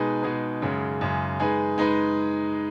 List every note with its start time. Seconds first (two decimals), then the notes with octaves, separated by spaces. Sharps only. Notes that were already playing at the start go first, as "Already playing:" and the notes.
Already playing: B2 G#3 D#4 G#4 B4
0.23 B2 G#3 D#4 G#4 B4
0.62 F#2 C#3 G#3
1.01 F#2 C#3 G#3
1.40 G#3 D#4 G#4 B4
1.78 G#3 D#4 G#4 B4